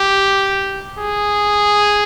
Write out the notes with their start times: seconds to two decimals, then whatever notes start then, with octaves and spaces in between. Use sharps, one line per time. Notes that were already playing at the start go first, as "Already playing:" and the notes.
Already playing: G4
0.99 G#4